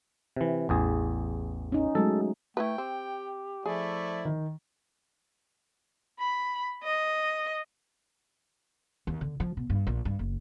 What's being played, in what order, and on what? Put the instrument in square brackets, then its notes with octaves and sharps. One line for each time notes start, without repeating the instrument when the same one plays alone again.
[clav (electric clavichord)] C3 E3
A1 E2 G#4
[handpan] C#4 D#4
[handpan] F#3 G#3 A3 [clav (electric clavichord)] A4
[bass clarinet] A3 [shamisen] E4 F#4 B4 [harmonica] G5
[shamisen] C4 [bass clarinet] G4
[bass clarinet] F3 [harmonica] A3 E4 D5 [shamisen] G#4
[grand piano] D#3
[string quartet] B5
D#5
[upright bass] D#2
D3
F3
B2
G2
A#1
G2
F#1